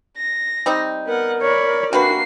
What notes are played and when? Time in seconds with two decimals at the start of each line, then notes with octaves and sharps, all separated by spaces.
0.17 A#6
0.66 G3 C4 D#4
1.07 B3 A#4 F#5
1.42 C#5 D5 B5
1.93 C3 A#3 D4 F#4 B4 C7